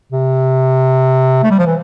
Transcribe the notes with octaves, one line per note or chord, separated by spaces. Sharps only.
C3
A3
G3
F3
E3